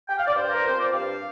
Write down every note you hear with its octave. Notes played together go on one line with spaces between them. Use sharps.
G5
F5
D5
G2 C5
A#4
F3 C4 C5
D5
G2 F5